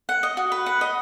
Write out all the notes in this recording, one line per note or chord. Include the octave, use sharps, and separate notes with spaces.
F#5
D#5
F#4
B4
F#5
D#5